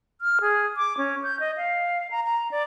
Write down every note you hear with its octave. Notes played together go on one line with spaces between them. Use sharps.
F6
G#4
D6
C#4
G6
D#5
F5
A#5
A#5
D5